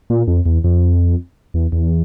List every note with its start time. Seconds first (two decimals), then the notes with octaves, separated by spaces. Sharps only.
0.10 A#2
0.28 F2
0.46 E2
0.64 F2
1.54 E2
1.72 E2